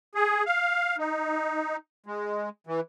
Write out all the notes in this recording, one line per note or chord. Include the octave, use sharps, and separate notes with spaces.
G#4
F5
D#4
G#3
E3